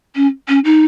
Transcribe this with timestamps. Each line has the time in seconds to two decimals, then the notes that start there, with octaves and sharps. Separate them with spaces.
0.16 C#4
0.48 C#4
0.65 D#4